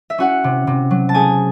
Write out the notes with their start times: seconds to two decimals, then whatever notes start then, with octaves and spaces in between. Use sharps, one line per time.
0.10 E5
0.18 C#4 F#4 F#5
0.44 C3
0.67 C3
0.91 F#3
1.09 A5
1.14 A3 G#4 G#5